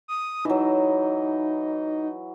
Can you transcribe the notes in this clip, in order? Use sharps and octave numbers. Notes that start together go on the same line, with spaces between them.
D#6
E3 F#3 D#4